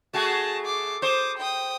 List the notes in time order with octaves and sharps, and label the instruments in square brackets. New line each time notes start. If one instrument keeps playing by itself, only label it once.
[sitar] A3 F#4 G#4 [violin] A5 A#6
[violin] D6 C7
[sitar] C5 [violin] D6 D#6
[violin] G5 D#6